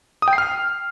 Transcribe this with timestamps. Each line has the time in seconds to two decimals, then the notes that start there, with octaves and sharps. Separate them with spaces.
0.22 D#6
0.28 G5
0.33 C7
0.38 F6